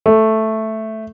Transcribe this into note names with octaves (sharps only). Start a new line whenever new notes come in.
A3